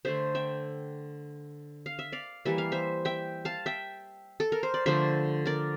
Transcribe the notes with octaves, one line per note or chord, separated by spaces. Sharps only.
D3 A3 C5 E5
E5 G5
F5
E5
D5 F5
E3 G3 A#3 E5
F5
C5 E5
E5 G5
F5 A5
E5 G5
A4
A#4
C5
D5
D3 F3 A3 C5 E5
A#4 D5